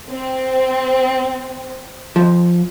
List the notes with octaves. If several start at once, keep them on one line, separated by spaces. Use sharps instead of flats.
C4
F2 F3